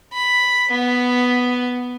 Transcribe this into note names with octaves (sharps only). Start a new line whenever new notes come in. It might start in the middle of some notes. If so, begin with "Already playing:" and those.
B5
B3